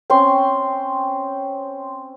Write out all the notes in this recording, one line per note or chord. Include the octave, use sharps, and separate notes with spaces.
C4 C#4 C6 C#6